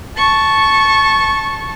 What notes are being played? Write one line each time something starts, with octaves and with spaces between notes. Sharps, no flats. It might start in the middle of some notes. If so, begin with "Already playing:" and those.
A5 C#6